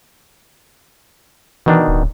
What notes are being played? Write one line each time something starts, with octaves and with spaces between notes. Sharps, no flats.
B2 D#3 E3 D4
D1